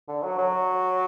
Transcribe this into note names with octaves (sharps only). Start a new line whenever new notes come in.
D3
F#3
F#3